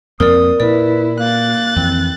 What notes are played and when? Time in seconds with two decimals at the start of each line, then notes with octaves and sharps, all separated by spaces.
0.20 F2 A#3 C4 A#4 D5 D#6
0.60 A#2 E4 B4 D5
1.20 A#3 F#6 A6
1.76 F2 E3 C4